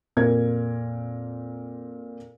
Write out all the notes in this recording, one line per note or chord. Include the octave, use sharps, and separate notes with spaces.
F2 A#2 A#4 G#6